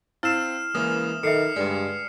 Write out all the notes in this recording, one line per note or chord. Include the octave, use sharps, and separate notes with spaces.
C4 E4 F5 E6 F6 C7 E7
C#3 E3 G#3 A#3 D#6
B1 D#3 A4 E5 C7 C#7
D2 G2 G#3 B4 D5